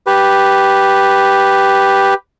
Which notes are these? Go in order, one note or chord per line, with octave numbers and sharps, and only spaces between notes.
G4 B4